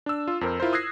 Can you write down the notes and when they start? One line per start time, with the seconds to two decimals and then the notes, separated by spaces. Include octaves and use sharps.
0.06 D4 E6
0.28 F4
0.41 F2 A#4 C5
0.60 E4 F4 A#4 C5
0.73 D#6 E6 F#6 G#6 A#6 C7